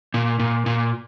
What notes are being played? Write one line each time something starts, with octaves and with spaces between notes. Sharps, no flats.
A#2
A#2
A#2